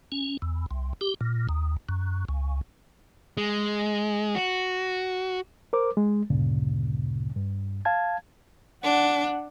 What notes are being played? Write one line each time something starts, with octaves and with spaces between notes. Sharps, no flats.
C#4
E2
C2
G4
A#2
D#2
F#2
C#2
G#3
F#4
A#4 C5 D6
G#3
D2 G2 A#2 C#3
G2
F5 A5 G#6
D4 F#5